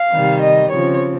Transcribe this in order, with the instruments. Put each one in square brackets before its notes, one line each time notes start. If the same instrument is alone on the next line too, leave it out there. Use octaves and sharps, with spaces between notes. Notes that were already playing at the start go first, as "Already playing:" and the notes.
Already playing: [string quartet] F5
C3 D#3 G3
D#5
C#3 F3 C4 C#5